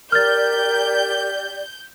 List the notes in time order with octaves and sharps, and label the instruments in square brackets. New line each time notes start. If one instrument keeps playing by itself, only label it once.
[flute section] G4 D5 [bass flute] A#4 [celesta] F6 A6 [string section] G6